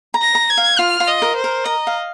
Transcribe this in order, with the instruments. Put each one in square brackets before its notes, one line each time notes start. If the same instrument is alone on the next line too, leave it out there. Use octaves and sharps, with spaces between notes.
[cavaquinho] A#5
[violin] A#6
[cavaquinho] A#5
[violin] G#6
[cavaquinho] F5
[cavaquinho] F4 [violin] F6
[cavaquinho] F4
[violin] D#5
[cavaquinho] A#4
[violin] C5
[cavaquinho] A#4
[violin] D#5 [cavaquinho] A#5
[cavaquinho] F5